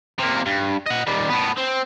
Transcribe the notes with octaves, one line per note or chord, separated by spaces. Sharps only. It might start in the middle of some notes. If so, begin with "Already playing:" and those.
C3 A#3
G2
D#5 F#5
D#3 G3
A2 B3
C4